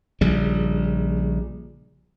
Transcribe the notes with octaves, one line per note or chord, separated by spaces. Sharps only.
A#1 C#3 G3